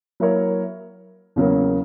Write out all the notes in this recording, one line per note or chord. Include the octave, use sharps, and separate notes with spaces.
F#3 A#3 E4 A#4 C#5
E2 C#3 F#3 A#3